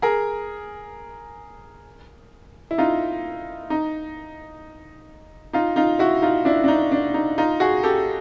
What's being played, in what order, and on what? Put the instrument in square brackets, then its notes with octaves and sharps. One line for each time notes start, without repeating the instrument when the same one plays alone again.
[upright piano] G#4 A#4
E4
D#4 F4
D#4
D#4 F4
D#4 F4
E4 F#4
D#4 F4
D4 E4
D4
D#4
D4
D#4
D#4 F4
F#4 G#4
G4 A4